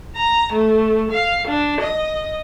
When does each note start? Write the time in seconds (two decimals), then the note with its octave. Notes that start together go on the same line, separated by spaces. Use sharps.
0.15 A#5
0.53 A3
1.11 F5
1.47 D4
1.80 D#5